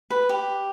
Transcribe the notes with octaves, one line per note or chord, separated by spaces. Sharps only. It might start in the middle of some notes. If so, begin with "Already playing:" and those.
B4
G4